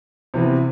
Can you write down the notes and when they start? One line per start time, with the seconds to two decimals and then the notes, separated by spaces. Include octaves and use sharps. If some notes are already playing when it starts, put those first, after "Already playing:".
0.34 C3 E3 B3